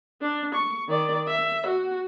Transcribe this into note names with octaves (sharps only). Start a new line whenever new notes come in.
D4
C#6
D#3 D5
E5
F#4